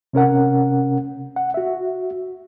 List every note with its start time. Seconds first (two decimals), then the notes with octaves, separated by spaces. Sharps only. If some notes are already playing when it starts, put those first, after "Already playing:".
0.13 C3 C#4 A#4 F#5
1.36 F#5
1.54 F#4 E5